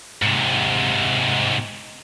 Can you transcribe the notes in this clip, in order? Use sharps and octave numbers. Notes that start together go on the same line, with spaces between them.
G#2 C3